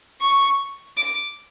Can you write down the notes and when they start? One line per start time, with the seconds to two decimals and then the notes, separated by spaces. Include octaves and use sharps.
0.21 C#6
0.97 D6